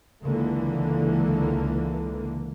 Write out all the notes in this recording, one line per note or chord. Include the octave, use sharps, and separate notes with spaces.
C#2 D3 E3 A#3